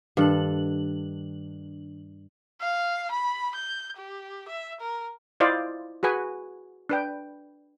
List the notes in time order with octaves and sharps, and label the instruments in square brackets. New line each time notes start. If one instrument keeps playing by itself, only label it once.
[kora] G2 A4 [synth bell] D#3 D4 F#7
[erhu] F5
B5
G6
G4
E5
A#4
[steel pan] E4 F4 C5 D5 D#5 F5
F#4 G#4 B4 G#5
D4 B4 G5